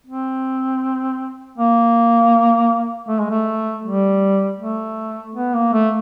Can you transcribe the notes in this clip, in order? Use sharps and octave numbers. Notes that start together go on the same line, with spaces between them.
C4
A#3
A3
G#3
A3
G3
A3
B3
A#3
A3